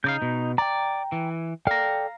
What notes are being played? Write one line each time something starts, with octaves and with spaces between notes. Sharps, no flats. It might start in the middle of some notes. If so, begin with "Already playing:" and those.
C#3 D#4 D5 F5 G6
B2
D5 G5 A#5
E3
A4 D5 F5 G5 A#5